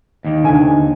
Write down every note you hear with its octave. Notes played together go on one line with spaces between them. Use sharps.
D#2 D#3
D2 G#5